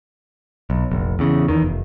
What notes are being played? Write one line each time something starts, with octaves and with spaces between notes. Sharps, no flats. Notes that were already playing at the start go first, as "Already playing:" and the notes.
B1
F1 A#1
E2 C#3
E2 D#3
F1